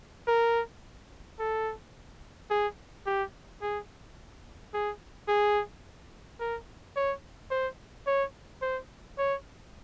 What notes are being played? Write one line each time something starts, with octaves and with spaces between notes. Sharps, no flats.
A#4
A4
G#4
G4
G#4
G#4
G#4
A#4
C#5
C5
C#5
C5
C#5